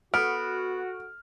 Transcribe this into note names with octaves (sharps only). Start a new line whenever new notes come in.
B3 F#4 A4 F6 D7